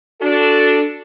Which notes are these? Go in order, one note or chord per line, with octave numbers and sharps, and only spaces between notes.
D4 F#4 A4